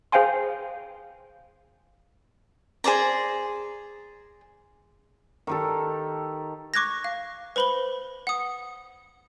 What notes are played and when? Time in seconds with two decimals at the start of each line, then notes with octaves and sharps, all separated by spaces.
0.12 G#4 C5 F5 G5 G#5 C6
2.84 G#4 C5 D5 A#5
5.47 D#3 G4 A4
6.74 C#6 D6 F#6 G#6 A#6
7.04 F5
7.56 B4 C5 B5 F#7 G7
8.27 F#5 D#6